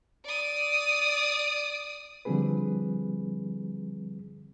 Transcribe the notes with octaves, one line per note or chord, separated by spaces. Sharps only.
D5 D#6
D3 F3 G3 C4 G#4 B4